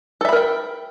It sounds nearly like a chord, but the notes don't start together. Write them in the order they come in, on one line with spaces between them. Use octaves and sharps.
A4 E5 B5 A#4 G5